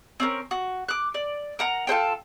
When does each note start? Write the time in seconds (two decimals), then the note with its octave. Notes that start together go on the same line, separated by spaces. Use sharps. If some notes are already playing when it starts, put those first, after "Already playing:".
0.20 C4 C#4 A#4
0.51 F#4
0.89 D6 F#6
1.14 D5
1.59 A#4 F#5 A#5
1.87 F4 A4 C5 G5